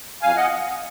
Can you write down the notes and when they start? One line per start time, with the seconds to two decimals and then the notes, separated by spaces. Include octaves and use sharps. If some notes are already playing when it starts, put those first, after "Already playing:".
0.22 F2 F5 G#5
0.36 D#5 F#5